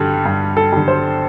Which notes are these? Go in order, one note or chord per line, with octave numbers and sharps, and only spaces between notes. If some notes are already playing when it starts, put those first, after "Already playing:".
Already playing: G2 D3 G3
G2
A4
D3 G3
C5